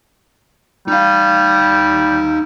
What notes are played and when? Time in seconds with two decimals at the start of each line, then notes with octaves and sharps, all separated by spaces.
0.88 G3 D#4 F5